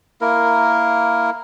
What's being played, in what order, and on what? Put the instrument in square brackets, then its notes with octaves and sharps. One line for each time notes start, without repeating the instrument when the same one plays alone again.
[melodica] A#3 E4 A#4